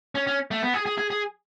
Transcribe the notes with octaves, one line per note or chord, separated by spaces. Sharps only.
C#4
C#4
A3
B3
G#4
G#4
G#4
G#4